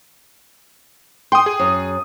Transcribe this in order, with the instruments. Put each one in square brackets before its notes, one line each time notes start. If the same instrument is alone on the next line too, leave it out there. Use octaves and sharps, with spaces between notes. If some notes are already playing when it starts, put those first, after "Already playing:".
[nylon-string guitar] G5 [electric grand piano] C6 D#6
[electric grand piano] G#4
[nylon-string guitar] F#2